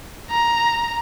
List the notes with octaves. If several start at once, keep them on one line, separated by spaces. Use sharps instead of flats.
A#5